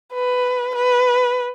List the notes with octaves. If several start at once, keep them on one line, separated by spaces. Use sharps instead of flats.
B4
B4